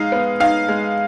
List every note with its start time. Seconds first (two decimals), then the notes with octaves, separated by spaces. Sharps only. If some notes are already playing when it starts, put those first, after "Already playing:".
Already playing: G#3 D#4 F5
0.12 B3
0.40 D#4 F5
0.68 G#3